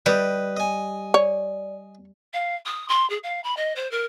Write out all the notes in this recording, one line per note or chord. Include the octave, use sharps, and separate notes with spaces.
G3 B4 D#5
D#5 G#5
C#5 D5
F5
D#6
C6
G#4
F5
B5
D#5
C5
A#4